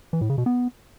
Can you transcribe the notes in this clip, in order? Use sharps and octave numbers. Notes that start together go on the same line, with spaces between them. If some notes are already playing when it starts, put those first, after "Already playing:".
E3
A2
C#3
B2
B3